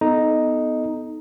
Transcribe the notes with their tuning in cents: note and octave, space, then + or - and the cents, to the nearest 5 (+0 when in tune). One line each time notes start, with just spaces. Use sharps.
B3 +15 D#4 +0 A4 -25